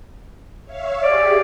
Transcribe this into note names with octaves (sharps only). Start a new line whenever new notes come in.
C#5 E5 F5
G4 G#4 D5